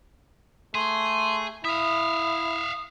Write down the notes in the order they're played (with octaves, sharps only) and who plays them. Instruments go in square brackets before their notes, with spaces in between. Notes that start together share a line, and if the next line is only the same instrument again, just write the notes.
[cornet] A3 [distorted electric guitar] G#4 [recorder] C6
[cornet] E4 [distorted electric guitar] E5 F5 [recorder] D#6